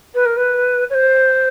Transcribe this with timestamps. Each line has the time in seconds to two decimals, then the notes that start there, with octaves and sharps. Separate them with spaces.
0.15 B4
0.26 A#4
0.37 B4
0.90 C#5
0.94 C5